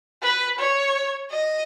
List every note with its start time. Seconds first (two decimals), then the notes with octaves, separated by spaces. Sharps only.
0.23 B4
0.59 C#5
1.31 D#5